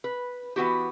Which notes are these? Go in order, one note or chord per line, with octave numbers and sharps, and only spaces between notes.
B4
E3 B3 F#4 G4